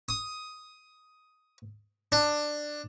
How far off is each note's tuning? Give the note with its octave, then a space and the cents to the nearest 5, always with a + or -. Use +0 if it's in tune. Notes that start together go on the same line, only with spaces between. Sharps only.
D#6 +10
D4 +15